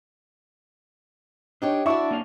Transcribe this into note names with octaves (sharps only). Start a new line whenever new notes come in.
D4 D#4 G4 C#5
D4 E4 F#4 D5 E5 C#6
A#3 C#4 F5